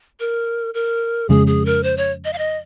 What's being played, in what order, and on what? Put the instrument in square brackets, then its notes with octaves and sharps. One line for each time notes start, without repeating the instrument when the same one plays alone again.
[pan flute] A#4
A#4
[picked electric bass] F2 C#3 G#3 [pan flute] G#4
[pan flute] G#4
A#4
C5
C#5
D#5
F5
D#5